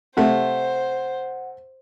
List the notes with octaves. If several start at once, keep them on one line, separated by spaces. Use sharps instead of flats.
C3 A3 C5 F#5